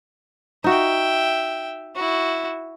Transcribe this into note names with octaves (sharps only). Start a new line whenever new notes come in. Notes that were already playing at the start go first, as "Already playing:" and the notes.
D#4 F#4 E5 G5
E4 F#4